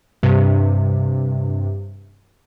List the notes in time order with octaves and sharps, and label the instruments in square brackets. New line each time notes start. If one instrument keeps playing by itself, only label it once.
[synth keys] G2 C3